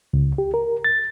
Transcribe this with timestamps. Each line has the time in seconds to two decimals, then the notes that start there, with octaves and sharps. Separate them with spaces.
0.13 C#2
0.38 G4
0.54 A#4
0.84 A6